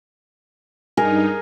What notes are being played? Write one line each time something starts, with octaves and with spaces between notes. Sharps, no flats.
G2 D#4 G#4 A#4